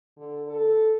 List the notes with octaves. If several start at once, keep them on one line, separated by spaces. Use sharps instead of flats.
D3
A4